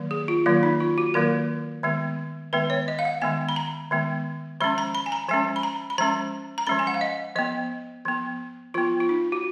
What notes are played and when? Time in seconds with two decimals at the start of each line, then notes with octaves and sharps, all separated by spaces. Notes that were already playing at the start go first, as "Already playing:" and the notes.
Already playing: D#3 F#3 A#3
0.11 G#4
0.28 F4
0.46 D#3 F#3 A#3 F4
0.63 D#4
0.80 F4
0.98 F#4
1.14 D#3 F#3 A#3 A#4
1.83 D#3 G#3 B3
2.53 D#3 G#3 B3 B4
2.70 C#5
2.88 D#5
2.99 F5
3.05 F#5
3.22 D#3 G#3 B3 G#5
3.49 B5
3.56 A#5
3.91 D#3 G#3 B3
4.60 F3 G#3 C#4 B5
4.78 A#5
4.95 B5
5.06 G#5
5.12 A#5
5.28 F3 G#3 C#4 G#5
5.56 B5
5.63 A#5
5.90 B5
5.98 F3 G#3 C#4 A#5
6.58 A#5
6.67 F3 G#3 C#4 B5
6.79 G#5
6.87 F#5
6.94 F5
7.01 D#5
7.36 F3 B3 D#5
8.05 F3 B3
8.74 F3 B3 F4
9.00 F4
9.09 D#4
9.32 F#4